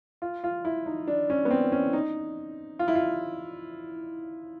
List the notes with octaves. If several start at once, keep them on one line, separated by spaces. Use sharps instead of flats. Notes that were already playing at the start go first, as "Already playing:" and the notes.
F4
F4
E4
D#4
D4
C#4
B3
C4
C#4
D#4
F4
E4
F4